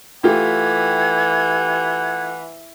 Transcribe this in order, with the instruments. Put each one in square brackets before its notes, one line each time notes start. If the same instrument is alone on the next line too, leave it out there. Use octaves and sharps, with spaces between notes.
[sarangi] E3 [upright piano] A3 F4 G4 [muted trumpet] F#5 [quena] G#6